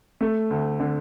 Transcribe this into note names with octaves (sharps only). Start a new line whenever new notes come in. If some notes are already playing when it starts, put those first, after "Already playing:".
A3
D2
D3